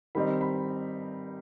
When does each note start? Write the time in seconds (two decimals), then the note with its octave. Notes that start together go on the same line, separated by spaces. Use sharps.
0.15 D#3 G3 C4 D#4 B5
0.41 B5